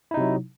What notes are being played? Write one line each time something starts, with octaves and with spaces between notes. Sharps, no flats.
C3 F#3 D#4 E4